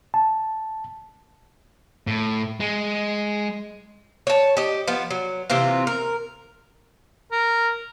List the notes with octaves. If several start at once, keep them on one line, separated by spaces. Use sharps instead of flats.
A5
A2
G#3
C#5 A5
G4 D#5
F3 B3
F#3
C3 E3 C4 F4
A#4
A#4